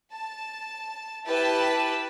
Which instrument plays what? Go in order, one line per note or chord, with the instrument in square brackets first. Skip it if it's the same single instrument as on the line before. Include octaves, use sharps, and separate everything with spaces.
[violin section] A5
E4 G4 B4 A5